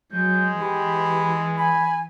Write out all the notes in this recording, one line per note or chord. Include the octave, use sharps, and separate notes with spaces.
F#3 G#3 G6
E3 G4 B5
G#5 B5